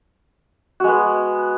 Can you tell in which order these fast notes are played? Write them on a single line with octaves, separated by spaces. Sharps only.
F#4 G#3 B3